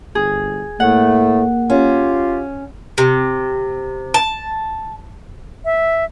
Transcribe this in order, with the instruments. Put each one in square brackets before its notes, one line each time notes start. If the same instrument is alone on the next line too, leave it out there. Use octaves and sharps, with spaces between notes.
[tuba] G1 [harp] G#4
[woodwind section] A2 A3 [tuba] A#3 [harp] F#5
[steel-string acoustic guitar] C#4 [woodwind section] F4 G4
[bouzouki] C3
A5
[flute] E5